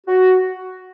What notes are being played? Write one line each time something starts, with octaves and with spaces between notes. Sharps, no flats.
F#4